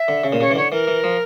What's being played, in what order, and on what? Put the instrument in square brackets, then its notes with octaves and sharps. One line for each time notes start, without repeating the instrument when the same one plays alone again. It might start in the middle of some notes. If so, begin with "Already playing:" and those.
Already playing: [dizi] E5
[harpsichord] D3
C#3
A#2
[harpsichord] C#3 [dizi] C#5
[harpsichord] E3
[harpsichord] D3 [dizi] C#5
[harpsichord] E3 [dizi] A#4
[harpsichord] E3
F3